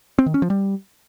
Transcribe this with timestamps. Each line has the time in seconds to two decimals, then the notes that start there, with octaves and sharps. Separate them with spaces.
0.19 C4
0.26 D#3
0.34 C#4
0.42 F3
0.50 G3